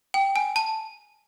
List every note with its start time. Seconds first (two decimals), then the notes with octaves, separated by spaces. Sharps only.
0.14 G5
0.36 G#5
0.56 A5